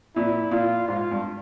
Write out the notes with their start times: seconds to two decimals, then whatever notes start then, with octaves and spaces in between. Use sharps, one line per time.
0.15 A#2 E4
0.51 A#2 F4
0.88 G#2 F4
1.11 G2